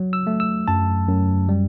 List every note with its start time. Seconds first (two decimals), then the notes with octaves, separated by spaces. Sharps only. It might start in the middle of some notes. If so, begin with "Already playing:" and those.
Already playing: F#3
0.13 E6
0.27 A3
0.40 E6
0.68 F#2 A5
1.08 F#2
1.49 G3